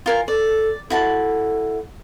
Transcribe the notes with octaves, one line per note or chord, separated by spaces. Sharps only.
F4 A#4 G#5
A4 D5
E4 F#4 A4 A5